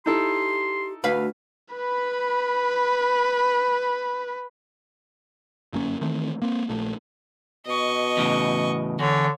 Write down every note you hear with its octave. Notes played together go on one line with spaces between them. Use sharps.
D#4 E4 G4 A4 C6
D2 F#4 B4 F5
B4 B5
G1 F#2 A#3 C#4
D#3 E3 A3 C4
A#3 C4
A#1 A#2 A3
B2 D#5 C#6
E2 A2 C#3
E2 D3 C#5